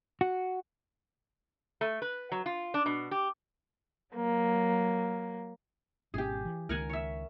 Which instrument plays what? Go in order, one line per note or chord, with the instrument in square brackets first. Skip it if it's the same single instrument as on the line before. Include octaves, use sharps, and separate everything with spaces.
[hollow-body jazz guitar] F#4
[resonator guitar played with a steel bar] A3
B4
F#3
F4
D4
B2
G4
[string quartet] F#3 A#3
[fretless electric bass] G#1 B2 C#4 [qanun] G4 G#4
[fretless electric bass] E3
[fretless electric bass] C#2 D#3 [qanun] A#4 F#5 G#5
[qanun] C#5 E5